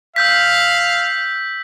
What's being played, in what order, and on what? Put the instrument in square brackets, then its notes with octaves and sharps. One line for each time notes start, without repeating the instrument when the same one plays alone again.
[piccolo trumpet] F5 [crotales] E6 G6 B6